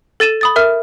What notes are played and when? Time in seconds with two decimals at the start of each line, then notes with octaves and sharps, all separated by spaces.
0.20 A4 A6 D#7 E7
0.41 B5 D#6 A6
0.56 A#4 E5 F6